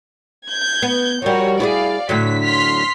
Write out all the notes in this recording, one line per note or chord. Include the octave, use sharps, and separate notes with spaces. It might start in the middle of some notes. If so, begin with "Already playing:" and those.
G6 G#6
B3
F3 G3 F#4 A#4 C#5
E4 F#4 G#4 D5 F5
A2 D3 F#3 B6
C6 F6 B6